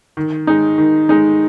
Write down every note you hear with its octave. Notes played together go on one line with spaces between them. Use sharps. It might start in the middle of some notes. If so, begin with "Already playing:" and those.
D#3
G#3 D#4
D#3
G#3 D#4